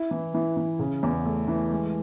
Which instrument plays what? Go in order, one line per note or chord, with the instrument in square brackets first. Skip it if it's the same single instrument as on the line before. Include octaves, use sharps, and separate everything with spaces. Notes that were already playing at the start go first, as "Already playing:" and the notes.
Already playing: [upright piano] E4
E3
E3
E3
C#3
E2
A3
E3
G#3